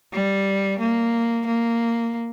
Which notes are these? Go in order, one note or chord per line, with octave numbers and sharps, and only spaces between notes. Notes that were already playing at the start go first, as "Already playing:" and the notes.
G3
A#3
A#3